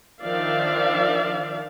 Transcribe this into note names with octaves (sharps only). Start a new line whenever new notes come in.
D#3 F3 D4 D5 E5 F5